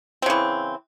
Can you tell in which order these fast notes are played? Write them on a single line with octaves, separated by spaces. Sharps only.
C4 C#3 E3